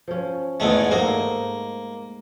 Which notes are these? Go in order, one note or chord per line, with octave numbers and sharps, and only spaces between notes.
F3 C#4
E2 G#2 A3
G#2 A3 A#3 D#5